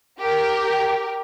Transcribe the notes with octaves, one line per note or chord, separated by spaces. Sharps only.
G4 A#4